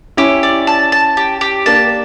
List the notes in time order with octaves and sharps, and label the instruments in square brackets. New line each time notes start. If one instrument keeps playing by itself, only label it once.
[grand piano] C#4 E4 [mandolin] G4
[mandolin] D5
A5
A5
G4
G4
[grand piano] A#3 D4 [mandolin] A5